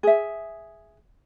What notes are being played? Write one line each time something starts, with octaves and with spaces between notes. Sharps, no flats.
G#4 E5